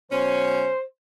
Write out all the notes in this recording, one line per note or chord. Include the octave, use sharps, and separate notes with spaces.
B2 F#3 C#4 C5